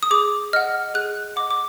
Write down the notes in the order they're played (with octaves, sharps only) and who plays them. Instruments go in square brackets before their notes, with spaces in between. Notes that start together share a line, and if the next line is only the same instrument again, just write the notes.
[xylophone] D#6
G#4 D6
D#5 F#5 F6
G#4 F#6
D#5 F#5 D6
D6